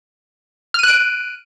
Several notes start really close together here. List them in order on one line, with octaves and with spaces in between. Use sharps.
F6 D#7 F#6 D7